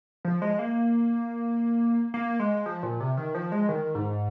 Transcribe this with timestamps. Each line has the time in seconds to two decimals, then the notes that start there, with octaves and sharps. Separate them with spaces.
0.25 F3
0.42 G#3
0.59 A#3
2.14 A#3
2.40 G#3
2.66 F3
2.83 A#2
3.00 C3
3.17 D#3
3.35 F3
3.52 G#3
3.69 D#3
3.95 G#2